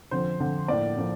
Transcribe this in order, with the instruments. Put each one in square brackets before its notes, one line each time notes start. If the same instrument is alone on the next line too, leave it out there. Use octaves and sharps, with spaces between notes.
[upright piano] F2 D3 F3 C5
F2 D3 F3
A2 F3 A#3 D5
A2 F3 A#3